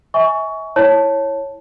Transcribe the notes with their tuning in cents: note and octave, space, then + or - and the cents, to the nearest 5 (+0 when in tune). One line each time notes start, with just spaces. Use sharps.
E5 -40 G#5 +0 C#6 +20
E4 +0 C#5 -5 A5 +0